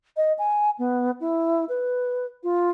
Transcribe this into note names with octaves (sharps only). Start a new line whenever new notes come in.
D#5
G#5
B3
E4
B4
F4